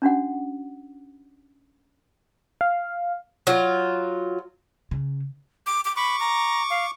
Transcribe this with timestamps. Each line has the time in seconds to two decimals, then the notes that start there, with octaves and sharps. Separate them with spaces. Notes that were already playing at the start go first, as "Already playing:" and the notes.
0.02 C#4 D4 F#4 F#5
2.61 F5
3.47 F#3 F4
4.91 C#3
5.67 D6
5.85 D6
5.97 B5 C#6 D6
6.20 A#5
6.70 F5